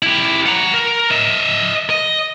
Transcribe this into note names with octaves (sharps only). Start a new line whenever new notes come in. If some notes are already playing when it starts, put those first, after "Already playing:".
E4 G4
F#5 A#5
A#4
D#5 E5
D#5